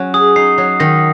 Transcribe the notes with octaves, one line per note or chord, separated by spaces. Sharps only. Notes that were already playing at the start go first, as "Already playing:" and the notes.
Already playing: F#3 C#4
G#4 D#6
D#4 C7
F#3 C7
D#3 A#6